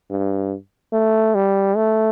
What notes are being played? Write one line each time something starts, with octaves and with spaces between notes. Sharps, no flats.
G2
A3
G3
A3